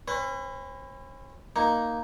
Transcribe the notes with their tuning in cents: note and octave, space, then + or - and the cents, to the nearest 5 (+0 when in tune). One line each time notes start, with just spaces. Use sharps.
C#4 -45 B4 +20
A#3 +0 D#4 +0